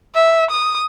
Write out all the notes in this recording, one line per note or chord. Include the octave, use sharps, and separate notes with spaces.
E5
D#6